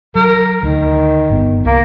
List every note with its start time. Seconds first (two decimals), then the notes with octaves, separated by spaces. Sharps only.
0.15 F#3 A#4
0.63 D2 D#3
1.30 G1 B3
1.65 C2 A#3